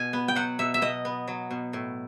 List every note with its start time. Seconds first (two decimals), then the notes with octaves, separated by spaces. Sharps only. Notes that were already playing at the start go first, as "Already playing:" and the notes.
Already playing: B2 G#5
0.13 B3
0.28 G5
0.35 F#3 F#5
0.59 B2 E5
0.74 E5
0.82 B2 D#5
1.05 B3
1.28 F#3
1.51 B2
1.73 A2